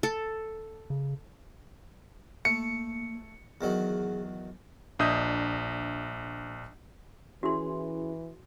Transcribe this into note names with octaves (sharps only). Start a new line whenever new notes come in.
A4
C#3
A3 A#3 C#7
E2 D#3 F#3 G#4
A#1 D4 D#5 E5 D#6 G6
E3 C#4 E4 F#4 G#4 C6